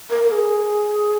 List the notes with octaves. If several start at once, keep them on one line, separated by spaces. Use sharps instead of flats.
A#4
A#4
G#4